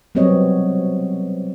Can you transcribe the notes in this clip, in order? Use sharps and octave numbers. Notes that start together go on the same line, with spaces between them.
F#3 G3 B3 C4 C#5 D#5